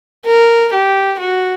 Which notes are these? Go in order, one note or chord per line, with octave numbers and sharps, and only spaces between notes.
A#4
G4
F#4